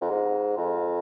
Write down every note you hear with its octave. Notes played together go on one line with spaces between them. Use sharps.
F2
G#2
F2